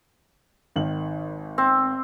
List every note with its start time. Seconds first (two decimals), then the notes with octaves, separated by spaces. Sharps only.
0.76 G#1 D#3 F#7
1.58 C4